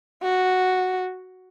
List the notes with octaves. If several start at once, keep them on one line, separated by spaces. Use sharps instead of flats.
F#4